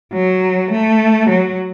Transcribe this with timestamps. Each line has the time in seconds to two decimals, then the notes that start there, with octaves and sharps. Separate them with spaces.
0.13 F#3
0.71 A3
1.29 F#3